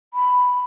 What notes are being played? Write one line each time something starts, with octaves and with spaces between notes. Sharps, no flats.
B5